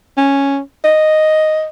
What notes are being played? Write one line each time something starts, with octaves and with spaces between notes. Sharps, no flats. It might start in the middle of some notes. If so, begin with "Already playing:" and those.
C#4
D#5